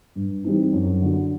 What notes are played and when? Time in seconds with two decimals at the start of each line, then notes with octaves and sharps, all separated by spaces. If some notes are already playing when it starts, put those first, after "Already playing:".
0.16 G2
0.44 E3 G3 C4 D#4
0.73 F#2
1.02 D3 F#3